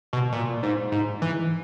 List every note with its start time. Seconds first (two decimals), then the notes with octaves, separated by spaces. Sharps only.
0.13 B2
0.33 A#2
0.63 G#2
0.92 G#2
1.22 E3